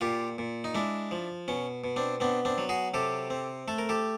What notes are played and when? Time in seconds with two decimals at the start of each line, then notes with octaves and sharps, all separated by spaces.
0.01 A#2 F4 G4
0.38 A#2
0.64 D#4
0.75 G#3 D4 E4
1.11 F3
1.48 B2 C#4
1.84 B2
1.96 C4 D4
2.20 B3 C4 D4
2.45 C4 D4
2.58 F#3
2.69 F#4 G#4
2.94 C3 G4 A4
3.30 C4
3.68 A3 A4
3.78 A#4
3.89 G4 A4